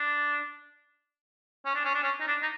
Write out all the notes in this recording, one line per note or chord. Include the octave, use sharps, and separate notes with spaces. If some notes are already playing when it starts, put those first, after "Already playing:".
Already playing: D4
C#4
D4
C#4
D4
C#4
D#4
D4
D#4